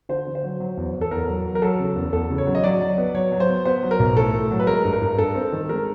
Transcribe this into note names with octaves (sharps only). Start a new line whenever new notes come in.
D3 C5
D3
C5
F#3
F#3
E2
E2
A4
E2 A#4
F#3
F#3
A#4
F#3 A4
C#3
E2
E2 A4
C#3
C#5
F#3
D#5
F#3 D5
F#3
B3
F#3 C#5
F#3
C5
B3
B3 C5
F#3
A#4
B1
A2 A4
A2
F#3
B4
G#3 A#4
G2
A#4
G2
G2 A4
C4
D#3
G#3 A#4